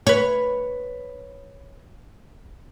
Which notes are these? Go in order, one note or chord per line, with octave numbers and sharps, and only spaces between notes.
B4 C#5